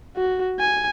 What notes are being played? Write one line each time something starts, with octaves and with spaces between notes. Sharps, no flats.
F#4
G#5